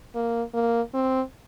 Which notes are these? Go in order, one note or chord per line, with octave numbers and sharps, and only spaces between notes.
A#3
A#3
C4